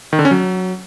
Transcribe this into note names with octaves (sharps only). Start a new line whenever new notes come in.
D#3
D3
C#4
F#3